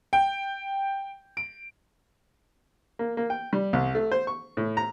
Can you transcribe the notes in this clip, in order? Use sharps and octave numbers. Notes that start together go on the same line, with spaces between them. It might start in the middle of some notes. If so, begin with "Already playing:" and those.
G5
D7
A#3
A#3
G5
G3
C2
A3
C5
C#6
A2
A#5